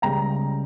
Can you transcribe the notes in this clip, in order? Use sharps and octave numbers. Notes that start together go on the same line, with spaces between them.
C#2 C#3 G3 G5 A#5